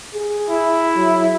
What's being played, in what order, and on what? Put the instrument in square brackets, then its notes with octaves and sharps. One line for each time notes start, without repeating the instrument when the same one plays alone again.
[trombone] G#4
[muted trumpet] E4
[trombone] F#3